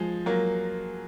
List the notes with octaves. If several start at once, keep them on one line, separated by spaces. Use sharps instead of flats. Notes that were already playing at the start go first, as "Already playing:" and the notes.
Already playing: F3 G#3
F#3 A#3